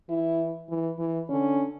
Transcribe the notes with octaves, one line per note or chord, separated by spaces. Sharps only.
E3 E4
E3
E3
D3 C#4